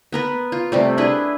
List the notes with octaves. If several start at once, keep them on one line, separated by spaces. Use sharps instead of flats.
B3 A#4 B4
F4
C3 G3 A3
D4 E4 G#4 B4